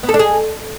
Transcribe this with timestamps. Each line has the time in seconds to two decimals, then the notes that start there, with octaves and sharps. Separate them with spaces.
0.03 B3
0.09 A4
0.14 D4
0.19 G#4